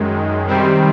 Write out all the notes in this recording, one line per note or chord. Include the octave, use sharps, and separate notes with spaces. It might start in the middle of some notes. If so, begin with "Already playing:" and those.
Already playing: F#2 D#3 G#3
C3 D#3 G3 C4